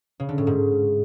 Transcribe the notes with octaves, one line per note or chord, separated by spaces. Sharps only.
C#3
D3
A2
G#2